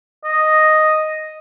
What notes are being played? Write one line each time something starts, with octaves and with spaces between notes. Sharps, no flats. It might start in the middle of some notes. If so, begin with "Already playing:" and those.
D#5